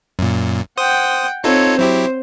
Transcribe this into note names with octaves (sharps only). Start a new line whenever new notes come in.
F#2 A#2
C5 F#5 G5 D#6
C4 D#4 F4 A4 C#5
F#3 E4 G4 C5